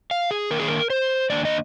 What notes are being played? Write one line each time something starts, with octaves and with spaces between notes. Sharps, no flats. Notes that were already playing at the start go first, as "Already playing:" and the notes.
F5
G#4
D#3 A#3 D4 A#4
G#4
A#4
C5
D#3 A#3 D4 D5
D#5